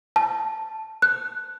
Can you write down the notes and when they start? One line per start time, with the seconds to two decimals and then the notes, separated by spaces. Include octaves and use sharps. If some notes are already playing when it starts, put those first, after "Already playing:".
0.16 A5
1.02 F#6